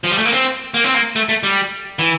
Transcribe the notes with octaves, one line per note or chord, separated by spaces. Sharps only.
F3
G3
A3
A#3
C4
A#3
C4
A#3
A3
A3
G3
E3